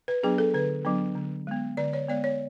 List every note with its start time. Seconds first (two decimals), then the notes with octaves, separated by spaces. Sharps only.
0.08 B4
0.23 F#3 B3 D4 G#4
0.38 A4
0.54 D3 B4
0.85 F#3 B3 D4
1.15 D3
1.47 G#3 B3
1.77 D3 D5
1.93 C#5
2.08 G#3 B3 D5
2.24 C#5